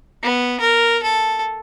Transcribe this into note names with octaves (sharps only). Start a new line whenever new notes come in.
B3
A#4
A4